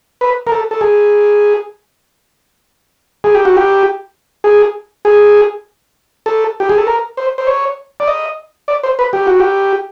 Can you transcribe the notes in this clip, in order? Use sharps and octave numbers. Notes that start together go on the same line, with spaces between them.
B4
A#4
A4
A4
G#4
G#4
G4
F#4
G4
G#4
G#4
A4
G4
G#4
A4
A#4
C5
C5
C#5
D5
D#5
D5
C5
B4
G4
F#4
G4